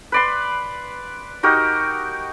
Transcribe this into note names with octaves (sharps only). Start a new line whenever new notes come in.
B4 D5 C6
D#4 F#4 G4 A#4